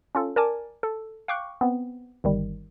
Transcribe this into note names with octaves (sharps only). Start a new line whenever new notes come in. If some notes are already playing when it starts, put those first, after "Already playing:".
C#4 F4 A4
A#4 D5 G#5 A5 D6
A4
F5 G5 C#6 D6 F#6
B3 C4
G1 D#3 G3